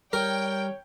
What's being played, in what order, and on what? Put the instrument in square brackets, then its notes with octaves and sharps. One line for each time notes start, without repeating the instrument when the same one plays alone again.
[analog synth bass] G3 [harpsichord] A#4 [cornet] C#5 [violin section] G5